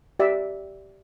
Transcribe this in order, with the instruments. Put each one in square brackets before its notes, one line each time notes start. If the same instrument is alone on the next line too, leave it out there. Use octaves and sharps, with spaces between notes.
[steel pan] G4 D5 E5